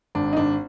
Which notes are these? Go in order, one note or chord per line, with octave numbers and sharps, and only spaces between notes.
G#1 D4
D#4
G#1 D4